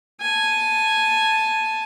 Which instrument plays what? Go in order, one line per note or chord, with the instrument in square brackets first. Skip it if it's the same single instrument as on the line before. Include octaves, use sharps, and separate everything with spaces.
[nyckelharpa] G#5 A5